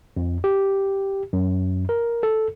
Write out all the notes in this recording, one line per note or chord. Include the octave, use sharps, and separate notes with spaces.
F2
G4
F#2
A#4
A4